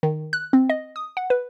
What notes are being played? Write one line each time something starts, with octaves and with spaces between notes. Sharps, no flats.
D#3
F#6
C4
D#5
D#6
F#5
B4